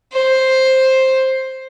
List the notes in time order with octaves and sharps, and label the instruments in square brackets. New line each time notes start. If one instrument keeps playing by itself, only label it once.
[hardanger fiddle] C5